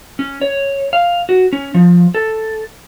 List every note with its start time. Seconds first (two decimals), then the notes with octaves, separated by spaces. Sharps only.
0.19 C#4
0.41 C#5
0.93 F5
1.29 F#4
1.53 C#4
1.74 F3
2.14 A4